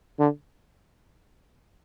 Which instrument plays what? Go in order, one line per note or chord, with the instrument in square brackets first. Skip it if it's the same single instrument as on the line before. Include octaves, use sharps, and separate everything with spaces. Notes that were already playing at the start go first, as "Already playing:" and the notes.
[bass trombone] D3